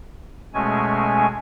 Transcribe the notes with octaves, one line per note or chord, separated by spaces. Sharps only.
B2 G#3 A3 C#4 G#5